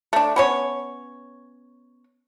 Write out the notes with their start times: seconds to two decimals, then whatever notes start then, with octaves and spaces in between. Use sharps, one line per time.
0.13 A3 D4
0.36 B3 C#4 C#5